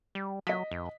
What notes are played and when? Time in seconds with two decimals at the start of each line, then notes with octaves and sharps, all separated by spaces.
0.15 G3
0.47 F#3 D#5 B6
0.71 F2